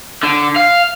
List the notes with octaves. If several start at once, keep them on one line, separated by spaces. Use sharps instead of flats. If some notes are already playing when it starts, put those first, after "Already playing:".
D3
F5